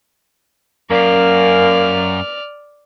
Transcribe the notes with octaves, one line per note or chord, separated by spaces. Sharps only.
F#2 A#3 D5 F6